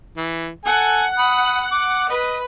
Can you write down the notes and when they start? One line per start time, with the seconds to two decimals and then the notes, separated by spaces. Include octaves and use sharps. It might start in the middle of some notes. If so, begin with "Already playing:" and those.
0.17 E3
0.66 A4 F#5 G#5
1.19 B5 D#6
1.72 D6
2.09 B4 D#5